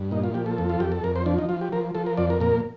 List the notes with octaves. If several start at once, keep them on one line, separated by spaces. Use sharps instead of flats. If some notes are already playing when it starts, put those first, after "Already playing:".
Already playing: G2
A#2 D#4
F4
F3 G4
A4
F2
F4
F2 G4
A4
F2 A#4
C5
F3 D4
D#4
F3 F4
G4
F3 A#4
F3 A4
A#4
F2 D5
A#4
A#2 A#4